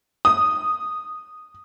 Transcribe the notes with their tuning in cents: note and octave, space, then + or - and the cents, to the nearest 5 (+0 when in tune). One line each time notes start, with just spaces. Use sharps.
D#6 -5